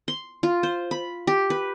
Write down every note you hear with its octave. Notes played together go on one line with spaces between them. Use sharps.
C6
F4
C5
B5
G4
B4